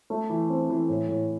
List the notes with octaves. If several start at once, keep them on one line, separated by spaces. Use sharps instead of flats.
A3
E3
C4
E3
A2
A2